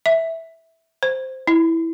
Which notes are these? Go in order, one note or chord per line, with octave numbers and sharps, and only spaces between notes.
E5
C5
E4